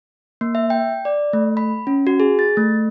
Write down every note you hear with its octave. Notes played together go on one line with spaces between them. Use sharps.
A#3
E5
G5
D5
A3
B5
C#4
F#4
G#4
A6
A3